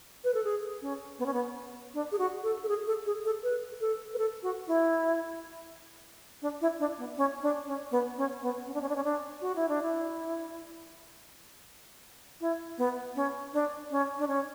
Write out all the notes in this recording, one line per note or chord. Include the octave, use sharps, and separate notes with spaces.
B4
A4
G#4
C#4
B3
C#4
B3
D4
G#4
F#4
A4
A4
G#4
A4
G#4
A4
B4
A4
B4
A4
F#4
E4
D4
E4
D4
B3
C#4
D4
C#4
B3
C#4
B3
C#4
D4
C#4
D4
C#4
D4
F#4
E4
D4
E4
E4
B3
C#4
D4
C#4
D4
C#4